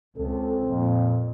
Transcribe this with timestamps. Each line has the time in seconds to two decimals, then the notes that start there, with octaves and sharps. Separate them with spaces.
0.18 C#2 C4 A4
0.67 F2 A#2